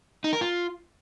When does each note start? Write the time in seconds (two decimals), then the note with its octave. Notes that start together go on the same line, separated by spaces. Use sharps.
0.24 D#4
0.33 A#4
0.41 F4